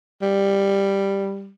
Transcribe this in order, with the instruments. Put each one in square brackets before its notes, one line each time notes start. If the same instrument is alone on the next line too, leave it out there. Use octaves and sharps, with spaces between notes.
[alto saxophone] G3